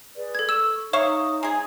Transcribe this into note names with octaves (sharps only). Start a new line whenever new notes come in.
G#4 B4 D5
A4 G#6
C#6 E6 E7
D#4 C#5 E5 F5 A#5 C#6 D#6
G#3 G#4